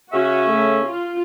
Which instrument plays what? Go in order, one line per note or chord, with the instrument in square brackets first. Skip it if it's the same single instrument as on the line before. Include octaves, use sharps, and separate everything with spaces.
[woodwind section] C#3 C#4 E5 [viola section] F#4
[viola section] A3
F4